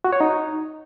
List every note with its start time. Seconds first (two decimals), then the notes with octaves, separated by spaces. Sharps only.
0.04 F#4
0.13 C#5
0.21 D#4